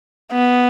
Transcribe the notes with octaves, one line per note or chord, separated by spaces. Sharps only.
B3